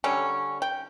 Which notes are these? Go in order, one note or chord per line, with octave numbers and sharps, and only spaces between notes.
D3 G3 C#4
G5